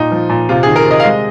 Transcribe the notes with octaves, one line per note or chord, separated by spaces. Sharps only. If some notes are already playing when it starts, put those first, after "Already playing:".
Already playing: A#2 D#4
F3
A#2
C3 F4
D#3 G#4
A#4
C3
D#5
F5
G#3 D#5